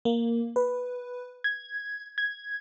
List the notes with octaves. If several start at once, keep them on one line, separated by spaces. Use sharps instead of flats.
A#3
B4
G#6
G#6